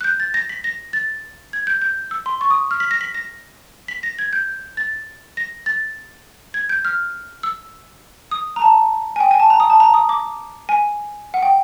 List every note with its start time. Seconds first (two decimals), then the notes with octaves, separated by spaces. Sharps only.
0.01 F#6
0.04 G6
0.20 A6
0.34 A#6
0.49 B6
0.64 A#6
0.93 A6
1.53 G#6
1.67 G6
1.82 G6
2.11 E6
2.26 C6
2.41 C#6
2.50 D#6
2.71 F6
2.80 B6
2.91 A#6
3.01 B6
3.14 A#6
3.88 B6
4.03 A#6
4.19 G#6
4.33 G6
4.77 A6
5.37 A#6
5.66 A6
6.54 G#6
6.69 G6
6.85 F6
7.43 E6
8.31 D#6
8.56 A#5
8.62 A5
9.16 G#5
9.20 G5
9.31 G#5
9.40 A5
9.50 A#5
9.60 D#6
9.70 A5
9.80 A#5
9.94 D#6
10.09 D6
10.69 G#5
11.34 F#5
11.42 G5